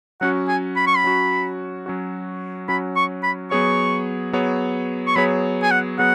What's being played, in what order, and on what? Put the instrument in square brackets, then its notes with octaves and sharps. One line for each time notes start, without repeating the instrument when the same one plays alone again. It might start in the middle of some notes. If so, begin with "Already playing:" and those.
[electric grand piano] F#3 C#4 F#4 [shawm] F#5
[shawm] G#5
B5
C#6
B5
[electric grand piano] F#3 C#4 F#4
F#3 C#4 F#4
[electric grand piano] F#3 C#4 F#4 [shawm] B5
[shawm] C#6
B5
[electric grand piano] F#3 B3 G#4 C#5 [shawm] C#6
[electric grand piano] F#3 B3 G#4 C#5
[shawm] C#6
[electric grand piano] F#3 B3 G#4 C#5 [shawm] B5
[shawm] G#5
F#5
[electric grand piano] F#3 B3 G#4 [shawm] F#5